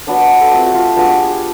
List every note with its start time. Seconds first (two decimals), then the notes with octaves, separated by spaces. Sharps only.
0.07 F#3 B3 D4 D5
0.18 B4
0.41 A4
0.52 A3 C4 F4 G4
0.66 F#4
0.74 F4
0.96 G#3 B3 D4 F4 F#4
1.07 G4
1.19 G#4
1.30 G4